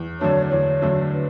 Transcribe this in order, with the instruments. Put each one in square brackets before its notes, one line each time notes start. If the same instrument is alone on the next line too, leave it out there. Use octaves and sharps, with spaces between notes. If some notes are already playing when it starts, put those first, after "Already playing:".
Already playing: [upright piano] E2
[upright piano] D3 F#3 A3 D4 [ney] C#5
[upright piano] E2 [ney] C#5
[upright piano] D3 F#3 A3 D4
[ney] B4